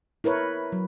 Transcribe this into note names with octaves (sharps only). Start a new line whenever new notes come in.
E4 A#4 B4 C#5
F#3